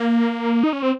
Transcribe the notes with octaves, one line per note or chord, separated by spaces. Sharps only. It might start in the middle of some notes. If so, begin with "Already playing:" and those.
Already playing: A#3
D#4
C#4
C4